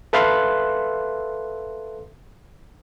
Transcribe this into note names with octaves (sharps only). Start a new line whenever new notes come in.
A4 B4 E5 F5 C6 F#6